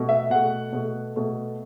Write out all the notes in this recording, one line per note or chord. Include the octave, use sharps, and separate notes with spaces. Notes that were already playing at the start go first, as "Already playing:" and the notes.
Already playing: B2 A3
E5
B2 A3 F#5
B2 A3
B2 A3